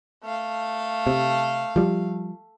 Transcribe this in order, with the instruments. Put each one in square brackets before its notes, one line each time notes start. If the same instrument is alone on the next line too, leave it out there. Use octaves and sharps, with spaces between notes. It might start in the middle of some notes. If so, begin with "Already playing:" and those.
[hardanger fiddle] A3 F5
[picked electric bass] C3
F3 G3